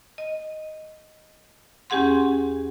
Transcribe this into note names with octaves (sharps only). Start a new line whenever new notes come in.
D#5
E2 C#4 G4 G#4 F#5 C6